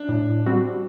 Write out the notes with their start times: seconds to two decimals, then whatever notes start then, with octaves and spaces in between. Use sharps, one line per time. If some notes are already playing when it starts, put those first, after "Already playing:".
Already playing: D4
0.09 A2
0.46 G3 C4 F#4